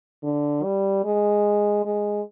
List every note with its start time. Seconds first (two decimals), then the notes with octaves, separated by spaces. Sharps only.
0.23 D3
0.63 G3
1.04 G#3
1.85 G#3